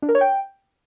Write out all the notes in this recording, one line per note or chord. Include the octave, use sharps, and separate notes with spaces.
D4
A#4
C#5
G5